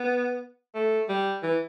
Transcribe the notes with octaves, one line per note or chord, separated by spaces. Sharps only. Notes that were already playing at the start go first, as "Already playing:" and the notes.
Already playing: B3
A3
G3
E3